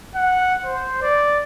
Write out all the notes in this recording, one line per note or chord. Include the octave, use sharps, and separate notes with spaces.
F#5
C5
D5